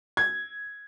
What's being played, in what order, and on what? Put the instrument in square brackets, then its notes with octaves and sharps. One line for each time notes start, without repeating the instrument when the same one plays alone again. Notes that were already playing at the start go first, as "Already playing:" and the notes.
[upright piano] G#6